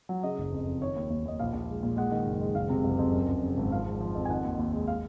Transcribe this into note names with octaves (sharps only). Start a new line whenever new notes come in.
F#3
C#3 D#5
F#1
F2
F2
D#3 C#5
D#2
D#2
D#2 D#5
A#1 F5
A#1
G#3
A#2
G#3 F#5
D#3
F#1
G#3
F#1 F5
C3
F#1
F2
F#2
F#2
C#3
G#1
F3 F5
G#3
F3
F2
G#5
D#3 F#5
D#2
D#2
G#3
F5